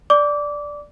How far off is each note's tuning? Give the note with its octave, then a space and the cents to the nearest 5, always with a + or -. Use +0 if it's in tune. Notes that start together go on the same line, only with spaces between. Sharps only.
D5 +0 D6 -20